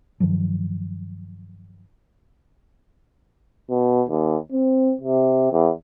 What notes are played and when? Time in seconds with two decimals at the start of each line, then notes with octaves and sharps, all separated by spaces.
0.20 G2 D#3 F3 F#3
3.70 B2
4.09 D#2
4.52 C4
5.01 C3
5.52 E2